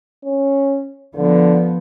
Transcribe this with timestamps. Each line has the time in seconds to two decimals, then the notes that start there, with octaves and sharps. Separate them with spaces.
0.24 C#4
1.15 D3 F3 B3